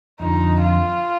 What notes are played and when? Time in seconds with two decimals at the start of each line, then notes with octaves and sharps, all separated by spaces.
0.20 F2 D3 F3 D#4
0.60 F4